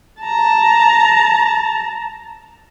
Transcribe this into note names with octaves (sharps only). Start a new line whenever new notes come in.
A5 A#5